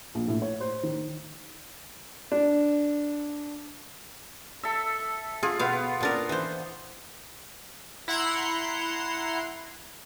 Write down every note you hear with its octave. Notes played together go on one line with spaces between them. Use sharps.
A#1
A2
C#5
C5
D#3
D4
A4 E5
F4 G#4
B2 B3 F5
A#2 D4 A#4
E3 C5
E4 F#5 A#5 C6 C7